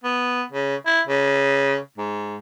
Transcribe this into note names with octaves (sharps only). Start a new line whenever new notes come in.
B3
C#3
E4
C#3
G#2